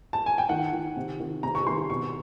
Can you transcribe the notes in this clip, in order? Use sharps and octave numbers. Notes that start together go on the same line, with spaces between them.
A5
G#5
G5
D#3 F#5
D#3
C3
D#3
C3 A#5
C#6
D#3 C6
B2 C#6